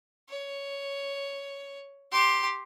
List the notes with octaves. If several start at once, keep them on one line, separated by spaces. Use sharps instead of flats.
C#5
G4 C6